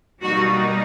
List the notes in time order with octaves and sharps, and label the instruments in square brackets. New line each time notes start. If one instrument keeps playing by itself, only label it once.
[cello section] B2 G3 A#3 D#4 F#4